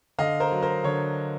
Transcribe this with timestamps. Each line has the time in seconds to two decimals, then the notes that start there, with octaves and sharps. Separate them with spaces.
0.18 D3 D#5 F5
0.40 A#4 C5
0.52 F#3
0.62 A#4 C5
0.84 D3 C#5